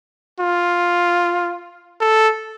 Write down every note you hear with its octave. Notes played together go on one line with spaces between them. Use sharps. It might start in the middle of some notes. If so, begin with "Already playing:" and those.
F4
A4